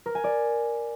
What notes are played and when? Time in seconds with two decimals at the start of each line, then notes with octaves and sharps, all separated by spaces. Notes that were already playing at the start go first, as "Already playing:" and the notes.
0.06 A#4
0.15 G#5
0.24 D5